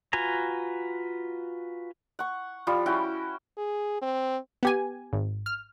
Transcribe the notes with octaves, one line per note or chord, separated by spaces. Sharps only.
F4 F#4 B4 G#5 A#5
F#5 C#6
F3 G3 F4
C#4 E4 F#4 G5
G#4
C4
B3 G4 G#5
G#1
F6